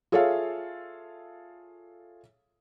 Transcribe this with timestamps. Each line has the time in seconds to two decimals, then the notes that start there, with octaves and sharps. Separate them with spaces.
0.12 F4 G#4 A4 C#5 E5 F5